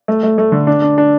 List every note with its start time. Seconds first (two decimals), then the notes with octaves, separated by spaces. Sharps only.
0.08 A3
0.23 A3
0.38 A3
0.52 D3
0.67 D4
0.82 D4
0.98 D4